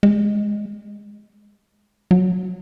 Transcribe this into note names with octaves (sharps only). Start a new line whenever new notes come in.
G#3
F#3